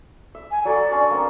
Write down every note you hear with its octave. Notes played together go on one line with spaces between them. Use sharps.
E5
G#5
F#3 A4 D5
C#4 D4 C6
A#3 C4